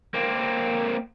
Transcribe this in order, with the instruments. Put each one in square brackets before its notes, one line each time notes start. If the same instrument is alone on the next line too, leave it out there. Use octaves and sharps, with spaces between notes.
[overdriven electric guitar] A#3 C4